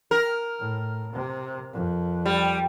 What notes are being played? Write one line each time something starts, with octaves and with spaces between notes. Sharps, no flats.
A#4
A2
C3
F2
G3